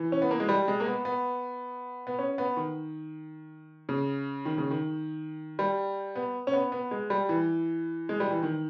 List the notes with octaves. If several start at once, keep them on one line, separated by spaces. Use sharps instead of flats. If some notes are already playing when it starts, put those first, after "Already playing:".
Already playing: E3
C#4
B3
A#3
G#3
G3
G#3
A#3
B3
B3
B3
C#4
B3
D#3
C#3
D#3
C#3
D#3
G3
B3
C#4
B3
B3
G#3
G3
E3
G#3
G3
E3
D#3